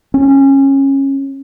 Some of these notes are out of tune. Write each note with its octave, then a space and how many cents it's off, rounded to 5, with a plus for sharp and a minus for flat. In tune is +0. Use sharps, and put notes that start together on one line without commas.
C#4 -20